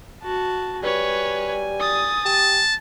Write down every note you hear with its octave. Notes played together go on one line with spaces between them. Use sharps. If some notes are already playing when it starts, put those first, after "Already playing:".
F#4 A5
G3 B4 C#5 G#5
D#6 A6
G4 A5